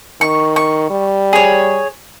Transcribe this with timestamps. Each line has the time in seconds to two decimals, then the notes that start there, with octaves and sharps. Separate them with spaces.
0.21 D#3 C#6
0.56 C#6
0.90 G3
1.33 G#4 C#5